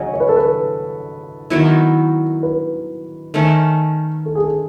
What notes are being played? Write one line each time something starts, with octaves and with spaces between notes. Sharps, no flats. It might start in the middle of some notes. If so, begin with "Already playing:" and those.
Already playing: C#3 F#3 C#4 C#5 D#5
C#5
B4
A4
B4
D#3 F#3 B3 E4
B4
D#3 A3 C#4
A4
G#4
A4